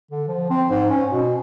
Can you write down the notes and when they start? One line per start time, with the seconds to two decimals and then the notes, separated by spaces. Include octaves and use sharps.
0.11 D3
0.28 F3
0.50 C4
0.70 G#2
0.90 C#4
1.11 B2